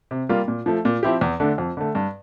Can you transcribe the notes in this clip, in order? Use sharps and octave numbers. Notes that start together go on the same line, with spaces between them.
C3
G3 A#3 F4
A#2
F3 A3
A#2
F3 C4 E4 G4
E2
D3 A3 D4
F2
D3 A3
G2